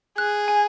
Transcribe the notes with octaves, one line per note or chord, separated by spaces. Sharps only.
G#4 F#6
G#5